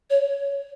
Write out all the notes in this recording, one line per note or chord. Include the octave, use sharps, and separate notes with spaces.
C#5